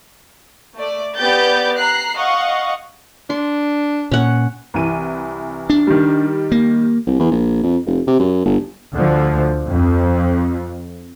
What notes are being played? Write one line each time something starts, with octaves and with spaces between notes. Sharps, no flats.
A3 D5
B3 G4 D5 G6 A6
A#5 F#6 C7
D#5 F5 F#5 C#6
D4 C6
A#2 C#4 F#5
C2 E3 D#7
D4
D#3 G3
A#3
C2
E2
A#1
F2
F1
C3
F#2
G1
D2 D3 F3
F2